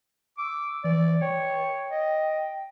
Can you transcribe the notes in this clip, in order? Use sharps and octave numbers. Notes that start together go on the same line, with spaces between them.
D6 E6
E3 D5
C#5 G5
D#5